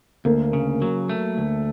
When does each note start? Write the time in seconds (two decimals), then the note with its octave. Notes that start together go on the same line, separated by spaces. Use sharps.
0.25 D2 A#3
0.53 C#3
0.82 F#3
1.09 A3
1.38 D2